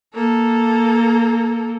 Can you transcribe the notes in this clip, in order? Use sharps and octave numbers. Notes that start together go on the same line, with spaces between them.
A#3 A4